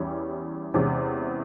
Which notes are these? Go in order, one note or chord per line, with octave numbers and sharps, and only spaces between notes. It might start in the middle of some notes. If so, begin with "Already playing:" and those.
Already playing: E2 E3 G3 C#4
E2 C3 E3 G#3 C#4